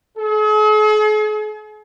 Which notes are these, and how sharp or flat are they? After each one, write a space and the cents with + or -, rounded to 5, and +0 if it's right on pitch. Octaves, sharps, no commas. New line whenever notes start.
G#4 +45